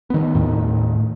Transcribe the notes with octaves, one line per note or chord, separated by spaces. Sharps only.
D#3 B3
D#2 A2 D#3